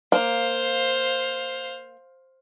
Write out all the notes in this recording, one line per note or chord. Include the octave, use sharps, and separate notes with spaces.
A#3 C5 F5